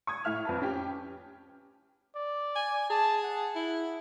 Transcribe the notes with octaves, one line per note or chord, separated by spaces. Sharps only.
C#6 D#6 G#6
A2 E5 F6 F7
F2 B4 A5
C#4 G4
D5
G#5
G#4 A5
F#5
E4